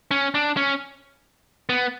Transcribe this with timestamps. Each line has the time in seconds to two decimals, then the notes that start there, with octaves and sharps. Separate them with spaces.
0.11 C#4
0.35 D4
0.57 C#4
1.69 B3